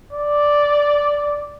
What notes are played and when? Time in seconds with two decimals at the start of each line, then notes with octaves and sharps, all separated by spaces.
0.13 D5